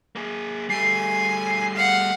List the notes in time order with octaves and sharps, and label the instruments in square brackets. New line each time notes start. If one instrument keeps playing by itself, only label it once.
[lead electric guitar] A#3 G#4
[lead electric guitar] G3 A3 [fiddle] G#5 [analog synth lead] C7
[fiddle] F5 F#5